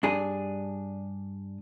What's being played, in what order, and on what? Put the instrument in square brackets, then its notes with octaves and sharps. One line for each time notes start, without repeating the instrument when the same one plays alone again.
[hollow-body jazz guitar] G2 D4 G#4